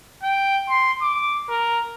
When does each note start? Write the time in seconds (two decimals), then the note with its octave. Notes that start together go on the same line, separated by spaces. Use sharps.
0.23 G5
0.69 C6
1.01 D6
1.50 A#4